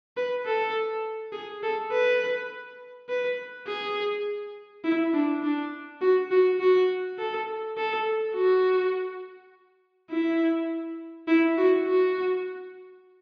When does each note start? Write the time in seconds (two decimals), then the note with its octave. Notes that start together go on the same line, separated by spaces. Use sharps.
0.17 B4
0.46 A4
1.33 G#4
1.63 A4
1.92 B4
3.09 B4
3.67 G#4
4.84 E4
5.14 D4
5.43 D4
6.01 F#4
6.31 F#4
6.60 F#4
7.19 A4
7.77 A4
8.35 F#4
10.11 E4
11.28 E4
11.58 F#4
11.87 F#4